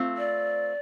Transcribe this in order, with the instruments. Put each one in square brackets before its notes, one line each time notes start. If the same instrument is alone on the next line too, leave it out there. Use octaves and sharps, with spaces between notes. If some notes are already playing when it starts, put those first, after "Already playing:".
Already playing: [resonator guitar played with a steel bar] A3 C4 F4
[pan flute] D5